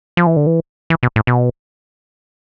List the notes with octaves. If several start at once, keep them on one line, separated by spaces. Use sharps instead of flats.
F3
E3
D3
E3
E3
B2
A2
B2